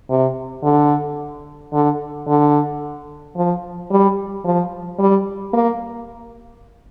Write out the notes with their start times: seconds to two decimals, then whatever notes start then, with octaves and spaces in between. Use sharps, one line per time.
0.10 C3
0.63 D3
1.73 D3
2.27 D3
3.36 F3
3.91 G3
4.44 F3
4.99 G3
5.54 A#3